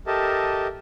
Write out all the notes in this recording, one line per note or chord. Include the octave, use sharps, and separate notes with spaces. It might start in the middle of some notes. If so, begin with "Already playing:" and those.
G4 A4 A#4 D#5 E5 A5